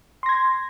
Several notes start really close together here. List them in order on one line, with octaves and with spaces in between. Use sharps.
C6 A#6 G#6